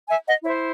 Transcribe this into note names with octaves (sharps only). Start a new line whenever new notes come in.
E5 G#5
D#5 F#5
E4 C5 C#5 E5